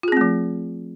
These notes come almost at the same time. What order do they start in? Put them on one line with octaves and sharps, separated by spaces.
F4 G#4 C4 A3 F3